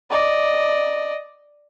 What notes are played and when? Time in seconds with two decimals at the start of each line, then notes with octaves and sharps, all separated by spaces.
0.10 D5 D#5